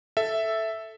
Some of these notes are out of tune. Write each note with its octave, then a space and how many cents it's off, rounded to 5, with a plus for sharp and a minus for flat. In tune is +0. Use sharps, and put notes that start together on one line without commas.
A4 +0 E5 +0